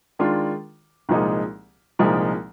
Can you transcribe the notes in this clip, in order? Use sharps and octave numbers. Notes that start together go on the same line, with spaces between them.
D#3 G#3 D4 F4
C2 A#2 F3 G#3 D#4
C2 A#2 F3 G#3 D#4